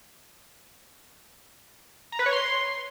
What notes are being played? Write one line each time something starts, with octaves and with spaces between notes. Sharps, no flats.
A#5
B4
C#5
C6